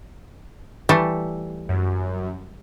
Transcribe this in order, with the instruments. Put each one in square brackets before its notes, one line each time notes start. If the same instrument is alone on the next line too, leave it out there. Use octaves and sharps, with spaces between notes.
[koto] E3 G3 A3
[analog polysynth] F#2